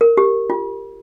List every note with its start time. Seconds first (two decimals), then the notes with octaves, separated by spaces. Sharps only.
0.01 A#4
0.17 G4
0.50 F4